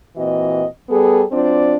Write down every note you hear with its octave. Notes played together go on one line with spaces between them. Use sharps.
A#2 E3 C4 F#4 D#5
G3 B3 G#4 A4
F#3 C4 D4 F4 C5 D5